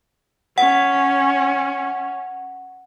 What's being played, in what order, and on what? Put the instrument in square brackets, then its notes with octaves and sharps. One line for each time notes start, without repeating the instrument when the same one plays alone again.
[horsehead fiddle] C#4 [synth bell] F#5